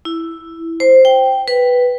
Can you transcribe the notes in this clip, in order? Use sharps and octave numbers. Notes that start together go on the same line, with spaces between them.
E4
C5
G5
B4